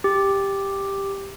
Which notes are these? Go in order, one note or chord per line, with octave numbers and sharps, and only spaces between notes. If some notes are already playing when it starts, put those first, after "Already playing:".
G4